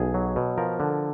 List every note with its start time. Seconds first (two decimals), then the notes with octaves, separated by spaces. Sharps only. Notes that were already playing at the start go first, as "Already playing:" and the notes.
Already playing: B1 G#4
0.14 F#3
0.36 B2
0.58 F3 A#4
0.80 D3